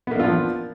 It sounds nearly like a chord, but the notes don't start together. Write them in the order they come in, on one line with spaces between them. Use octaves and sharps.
B3 A#3 D4 F4 F3